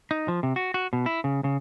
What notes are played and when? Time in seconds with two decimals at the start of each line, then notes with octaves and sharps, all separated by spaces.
0.11 D#4
0.28 F3
0.43 C3
0.56 F#4
0.74 F#4
0.93 B2
1.06 E4
1.24 C#3
1.44 C#3